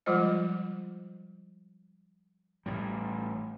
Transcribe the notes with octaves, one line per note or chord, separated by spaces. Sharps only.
F3 G3 G#3 F4 C5 D#5
A1 A2 G3